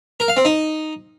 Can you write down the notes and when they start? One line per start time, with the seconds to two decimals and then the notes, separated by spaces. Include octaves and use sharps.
0.20 A#4
0.28 F5
0.37 C4
0.45 D#4